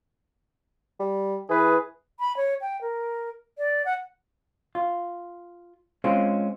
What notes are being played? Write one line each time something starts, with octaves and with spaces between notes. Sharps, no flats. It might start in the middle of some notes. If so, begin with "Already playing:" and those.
G3
E3 G#4 B4
B5
C#5
G5
A#4
D5
F#5
F4
G#3 C4 C#4 F4